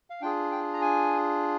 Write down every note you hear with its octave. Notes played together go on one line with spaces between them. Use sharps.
F5
D4 F4 G#4 G5
G5
A#5
G#5